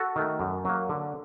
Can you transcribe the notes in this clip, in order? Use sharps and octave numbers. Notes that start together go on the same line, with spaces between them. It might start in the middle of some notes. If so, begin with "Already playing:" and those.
Already playing: F#4 A4
D#3 A3
F#2
F#3 A#3
D3